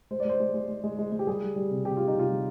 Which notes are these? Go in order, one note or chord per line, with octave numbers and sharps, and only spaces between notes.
G#3 C5
D5
G#3 C5
G#3
G#3
G#3
G#3
G#3
G#3
G4
G3 G#4
G3
G3
C3
C3 G4
G3 F4
D#4
C3 F4
G3